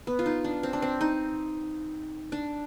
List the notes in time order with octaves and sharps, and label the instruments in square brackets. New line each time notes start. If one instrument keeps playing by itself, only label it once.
[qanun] B3
F4
D#4
D4
C4
D4
C4
D#4
D4